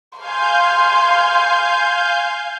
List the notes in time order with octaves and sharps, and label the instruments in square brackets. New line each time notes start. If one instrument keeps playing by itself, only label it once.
[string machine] F5 G#5 G6 [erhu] C6